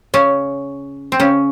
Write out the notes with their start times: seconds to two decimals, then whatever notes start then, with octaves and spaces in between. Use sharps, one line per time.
0.14 C#3 C#4
1.12 C4
1.20 C#3 C#4